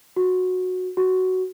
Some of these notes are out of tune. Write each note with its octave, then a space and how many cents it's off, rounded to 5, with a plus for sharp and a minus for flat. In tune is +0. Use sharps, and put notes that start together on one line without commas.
F#4 -10
F#4 +10